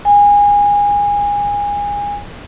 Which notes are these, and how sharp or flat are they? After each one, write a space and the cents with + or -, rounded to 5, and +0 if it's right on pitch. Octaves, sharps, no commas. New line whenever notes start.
G#5 -25